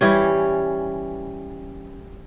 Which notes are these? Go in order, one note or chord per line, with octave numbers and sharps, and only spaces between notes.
E3 G3 C#4